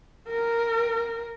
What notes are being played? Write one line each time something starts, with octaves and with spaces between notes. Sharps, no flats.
A#4